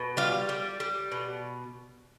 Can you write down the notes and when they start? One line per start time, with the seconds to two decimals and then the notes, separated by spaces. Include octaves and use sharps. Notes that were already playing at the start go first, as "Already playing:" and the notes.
Already playing: B2
0.17 G3 F4
0.49 G3
0.80 G3
1.12 B2